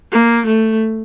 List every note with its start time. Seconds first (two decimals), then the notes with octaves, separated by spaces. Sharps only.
0.11 A#3
0.46 A3